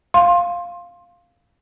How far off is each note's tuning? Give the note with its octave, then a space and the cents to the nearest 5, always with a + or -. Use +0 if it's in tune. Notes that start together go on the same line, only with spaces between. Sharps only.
F5 +0 C6 +20